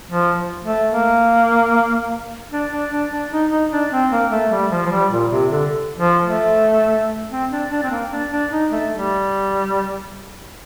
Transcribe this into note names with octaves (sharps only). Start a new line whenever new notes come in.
F3
A3
A#3
D4
D4
D4
D4
D#4
D#4
D4
C4
A#3
A3
G3
F3
F3
G3
A#2
C3
D3
F3
A3
C4
D4
D4
C4
A#3
D4
D4
D#4
A3
G3